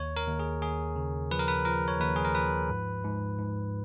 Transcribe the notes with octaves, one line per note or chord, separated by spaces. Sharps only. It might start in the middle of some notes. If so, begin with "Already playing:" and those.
Already playing: D#2 C#5
A#4
D#2
G#4
D#2 G#4
C#3
F3 B4
A#4
B4
F3 A#4
C#5
D#2 B4
G#4
A#4
F3 B4
G#2
G#2
G#2